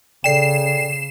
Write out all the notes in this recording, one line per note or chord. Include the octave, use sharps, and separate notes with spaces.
C#3 A4 D5 G5 C7 E7